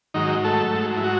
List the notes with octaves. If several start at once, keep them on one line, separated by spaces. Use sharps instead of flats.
G#2 D#3 F#3 D#4
A3 A4
G#2 F#3
E4
F#3 F#4